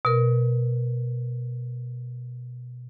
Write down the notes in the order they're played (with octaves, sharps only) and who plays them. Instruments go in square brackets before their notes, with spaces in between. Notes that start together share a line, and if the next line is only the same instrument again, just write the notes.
[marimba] B2 A#4